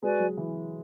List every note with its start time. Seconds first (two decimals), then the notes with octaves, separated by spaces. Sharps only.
0.02 G#3 F#4 B4 D5 G#5
0.19 F#3
0.37 E3